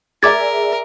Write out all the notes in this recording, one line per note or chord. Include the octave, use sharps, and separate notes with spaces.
G#4 A#4 D5 E5 D6 G#6 A6